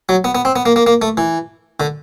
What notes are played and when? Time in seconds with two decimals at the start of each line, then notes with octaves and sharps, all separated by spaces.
0.09 F#3
0.24 B3
0.35 B3
0.45 C4
0.56 B3
0.66 A#3
0.76 A#3
0.87 A#3
1.02 A3
1.17 E3
1.80 D3